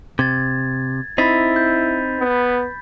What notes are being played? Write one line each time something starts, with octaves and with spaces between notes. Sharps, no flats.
C3 G#6 A6
C4 D#4 E4 B5 A6 B6
G6
B3